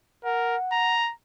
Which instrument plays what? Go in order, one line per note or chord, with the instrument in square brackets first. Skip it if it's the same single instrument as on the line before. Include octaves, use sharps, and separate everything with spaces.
[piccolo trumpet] A#4 [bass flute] F#5
[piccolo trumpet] A#5